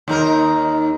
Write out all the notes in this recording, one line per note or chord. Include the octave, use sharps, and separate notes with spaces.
D#2 D#4 A#4